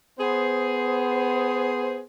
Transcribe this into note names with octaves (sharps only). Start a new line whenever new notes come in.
B3 G#4 C5